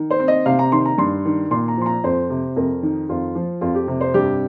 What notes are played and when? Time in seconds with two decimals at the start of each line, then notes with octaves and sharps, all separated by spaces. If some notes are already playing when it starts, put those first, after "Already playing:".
Already playing: D#3
0.11 C5
0.20 C4
0.28 D#5
0.46 C3 F5
0.59 A#5
0.72 D#3 C6
0.85 A#5
0.98 G2 C6
1.25 D#3
1.51 A#2 C6
1.68 A#5
1.77 F3 C6
1.86 A#5
2.04 F2 C5
2.30 C3
2.56 F2 A#4
2.83 D#3
3.09 F2 F4
3.35 F3
3.61 F2 F4
3.75 G4
3.88 C3
4.01 C5
4.14 G2 G4